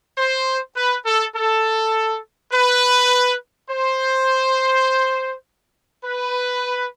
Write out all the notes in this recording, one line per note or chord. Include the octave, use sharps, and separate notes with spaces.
C5
B4
A4
A4
B4
C5
B4